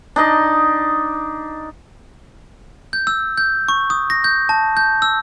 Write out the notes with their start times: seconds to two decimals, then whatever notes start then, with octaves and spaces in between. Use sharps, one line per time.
0.16 D4 D#4 D#5
2.93 G6
3.07 E6
3.38 G6
3.68 C#6
3.90 D#6
4.10 A#6
4.24 G6
4.49 A5
4.77 G6
5.02 E6